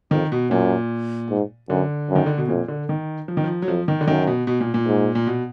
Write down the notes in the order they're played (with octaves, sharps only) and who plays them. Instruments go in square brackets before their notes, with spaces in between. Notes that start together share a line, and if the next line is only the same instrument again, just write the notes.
[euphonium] F2 [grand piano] D#3
[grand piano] B2
[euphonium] F#2 [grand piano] A#2
[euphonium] G#2
[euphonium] F#2 [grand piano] D3
[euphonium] F#2
[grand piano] D#3
D3
B2
[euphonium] F2 [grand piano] A#2
[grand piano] D3
D#3
F3
D#3
F3
F#3
[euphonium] F2 [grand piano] F3
[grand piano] D#3
D3
[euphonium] F#2 [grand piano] D#3
[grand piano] B2
B2
A#2
A#2
[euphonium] G#2
[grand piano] A#2
B2